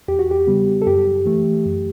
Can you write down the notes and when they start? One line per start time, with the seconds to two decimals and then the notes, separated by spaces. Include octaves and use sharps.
0.08 E2 G4
0.19 F#4
0.31 G4
0.47 C#3 G3 B3
0.82 A4
0.87 F#2 G4
1.26 E3 A3
1.65 F#2